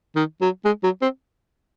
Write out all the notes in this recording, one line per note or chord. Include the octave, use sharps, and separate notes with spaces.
D#3
F#3
G#3
F#3
C4